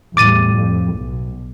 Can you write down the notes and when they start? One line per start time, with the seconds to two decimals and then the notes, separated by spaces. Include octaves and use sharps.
0.17 E2 A2 G3 D6 A6 D#7
0.56 F2
0.98 B1